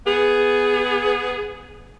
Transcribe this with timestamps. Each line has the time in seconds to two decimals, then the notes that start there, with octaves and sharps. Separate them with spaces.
0.06 B3 G#4